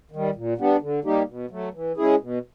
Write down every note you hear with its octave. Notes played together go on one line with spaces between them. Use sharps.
D#3 G3
A#2
G3 B3 D4
D3
G3 A#3 D#4 G4
B2
F#3 A3
E3
G#3 C#4 E4 G#4
B2